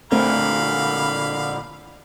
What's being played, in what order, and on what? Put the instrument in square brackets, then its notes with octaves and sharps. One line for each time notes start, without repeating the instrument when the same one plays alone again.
[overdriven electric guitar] A#2 D3 [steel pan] A3 C4 A#4 [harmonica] F5 B5